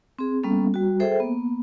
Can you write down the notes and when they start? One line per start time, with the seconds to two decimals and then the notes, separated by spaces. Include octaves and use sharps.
0.19 C4 G#4
0.43 G3 A#3 B3 C#4 A4
0.74 G3 F#4
1.00 G#4 A4 C5 E5 G5
1.20 A#3 B3